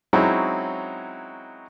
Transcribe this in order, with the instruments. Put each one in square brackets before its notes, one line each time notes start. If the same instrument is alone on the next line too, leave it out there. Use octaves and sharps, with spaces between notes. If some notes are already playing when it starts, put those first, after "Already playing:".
[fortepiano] F#3 G#3 C4 C#4 D#4 E4